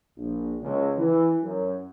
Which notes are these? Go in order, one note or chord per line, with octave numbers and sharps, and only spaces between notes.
A#1
C#2
E3
F#2